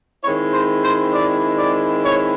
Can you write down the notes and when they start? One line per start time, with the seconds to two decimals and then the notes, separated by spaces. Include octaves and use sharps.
0.23 D#3 G#3 C4 E4 C#5
0.53 C5
0.83 C5
1.12 D5
1.58 D5
2.03 C#5